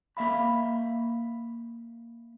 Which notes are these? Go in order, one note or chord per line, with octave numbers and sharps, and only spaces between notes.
A#3 E5 F5 B5